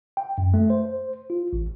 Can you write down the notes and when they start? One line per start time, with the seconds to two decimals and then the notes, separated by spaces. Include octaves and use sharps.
0.17 G5
0.38 F#2
0.54 A3
0.70 C5
1.30 F4
1.53 A1